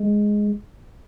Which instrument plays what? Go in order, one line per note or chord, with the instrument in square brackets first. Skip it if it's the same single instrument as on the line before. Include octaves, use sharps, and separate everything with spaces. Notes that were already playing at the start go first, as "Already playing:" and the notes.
Already playing: [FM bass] G#3